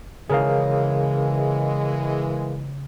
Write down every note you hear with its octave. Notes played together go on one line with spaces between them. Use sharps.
C#3 E3 G#3 G#4 A#4 F5